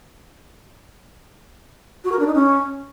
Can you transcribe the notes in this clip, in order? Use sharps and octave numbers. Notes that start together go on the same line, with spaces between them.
F#4
A#4
D4
D#4
C#4